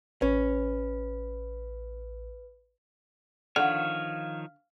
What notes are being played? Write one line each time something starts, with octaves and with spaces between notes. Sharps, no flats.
A1 C#4 B4
D3 D#3 F3 C#5 F5 F#5 F6